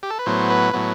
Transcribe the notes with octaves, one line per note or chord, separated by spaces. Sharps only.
G4
A4
B4
A2 F#3 B3 C5
B4
A2 F#3 B3